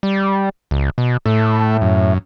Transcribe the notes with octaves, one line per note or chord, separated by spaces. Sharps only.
G3
C#2
B2
A2 A3
F#2